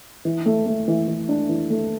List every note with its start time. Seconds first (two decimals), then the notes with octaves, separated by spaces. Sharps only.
0.25 E3
0.46 A3
0.66 A3
0.88 E3
1.08 E3
1.29 D4
1.49 E3
1.70 A3